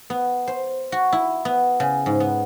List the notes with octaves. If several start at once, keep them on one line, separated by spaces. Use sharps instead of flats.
B3
C5
F#4
E4
B3
C#3
G#2
B3